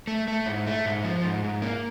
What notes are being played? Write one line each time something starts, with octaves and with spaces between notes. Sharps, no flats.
A3
A3
G#2
A3
G#2
F3
G#2
G#2
A#3